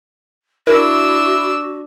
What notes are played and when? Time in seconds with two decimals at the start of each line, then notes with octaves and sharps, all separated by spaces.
0.67 D4 E4 F#4 A#4 E6